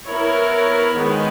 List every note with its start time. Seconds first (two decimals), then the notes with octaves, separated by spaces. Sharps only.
0.08 B3 E4 A#4 C#5
0.99 D#3 G#3 B3